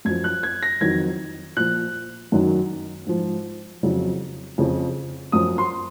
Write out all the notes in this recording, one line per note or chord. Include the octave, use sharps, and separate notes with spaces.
F#2 F3 G#6
F#6
G#6
A#6
F2 D#3 F#3 G#6
A#2 F3 F#6
F#2 D#3 F#3
G#2 F3
F2 C#3 F#3
F2 C#3 F3
F#2 F3 D#6
C6